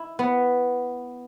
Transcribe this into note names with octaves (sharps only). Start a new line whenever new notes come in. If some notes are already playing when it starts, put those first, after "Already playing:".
Already playing: E4
B3